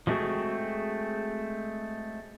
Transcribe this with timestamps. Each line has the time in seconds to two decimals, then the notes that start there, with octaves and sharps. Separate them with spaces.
0.07 F3 G#3 A3 C4 F#4 G#4